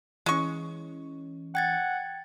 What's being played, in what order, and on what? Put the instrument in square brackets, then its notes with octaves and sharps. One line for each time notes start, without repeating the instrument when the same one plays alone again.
[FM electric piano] E3 C#4 [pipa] G#3 C#6
[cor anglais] F#5 [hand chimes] G5 G#6 A6